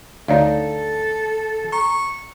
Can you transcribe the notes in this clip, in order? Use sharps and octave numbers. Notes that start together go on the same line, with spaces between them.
D2 D#4 A4 C#5 D5 F5
A#5 C#6